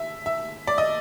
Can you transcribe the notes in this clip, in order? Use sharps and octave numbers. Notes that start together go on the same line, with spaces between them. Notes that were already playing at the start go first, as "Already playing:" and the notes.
Already playing: E5
E5
D5
D#5